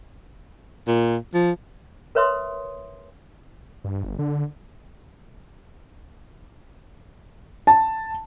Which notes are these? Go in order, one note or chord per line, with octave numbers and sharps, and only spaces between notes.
A#2
F3
A#4 B4 C#5 E5 C6 D#6
G2
G1
D3
A5